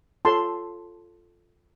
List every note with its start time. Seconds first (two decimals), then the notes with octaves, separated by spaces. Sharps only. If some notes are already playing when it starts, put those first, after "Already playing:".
0.25 F4 A4 C#5 A5 C6